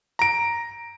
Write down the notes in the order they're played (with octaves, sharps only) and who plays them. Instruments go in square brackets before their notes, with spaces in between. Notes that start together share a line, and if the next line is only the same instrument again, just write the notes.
[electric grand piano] A#5 D7